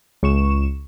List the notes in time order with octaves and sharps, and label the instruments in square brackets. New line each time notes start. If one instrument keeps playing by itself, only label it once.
[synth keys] C#2 C#6 E7